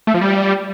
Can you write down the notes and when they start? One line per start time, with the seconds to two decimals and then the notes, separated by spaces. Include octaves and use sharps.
0.07 A3
0.14 F3
0.21 G3